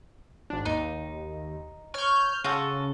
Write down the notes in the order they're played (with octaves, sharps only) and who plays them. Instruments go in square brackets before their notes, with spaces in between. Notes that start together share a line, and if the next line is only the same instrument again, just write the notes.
[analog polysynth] G#1 D4
[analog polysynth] D#2 [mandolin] D#4
[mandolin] C#5 [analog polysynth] F6 G6
[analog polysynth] C#3 [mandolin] F4 F#4 A4